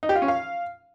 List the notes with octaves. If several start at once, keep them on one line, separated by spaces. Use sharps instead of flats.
D#4
G4
F4
C#4
F5